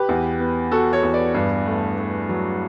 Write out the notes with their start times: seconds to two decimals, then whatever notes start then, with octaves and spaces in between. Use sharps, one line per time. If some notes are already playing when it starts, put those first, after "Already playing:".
Already playing: G4 B4
0.09 E2
0.40 B3
0.72 B3 F#4 A4
0.92 A4 C#5
1.03 E2
1.14 B4 D5
1.35 G2
1.66 A3
1.98 A3
2.29 F#3